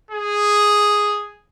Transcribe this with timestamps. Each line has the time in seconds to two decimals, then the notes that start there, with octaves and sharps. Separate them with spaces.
0.11 G#4